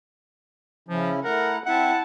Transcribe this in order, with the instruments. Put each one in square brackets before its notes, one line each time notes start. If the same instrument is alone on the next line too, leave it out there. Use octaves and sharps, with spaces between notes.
[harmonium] C#3 C#4 E4 [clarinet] F3
[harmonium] A3 E4 A#5 [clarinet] A#4 [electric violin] F#5
[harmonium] C4 E5 [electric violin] E4 A5 [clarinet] F#5